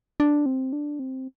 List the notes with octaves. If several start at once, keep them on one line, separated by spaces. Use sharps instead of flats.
D4
C4
D4
C4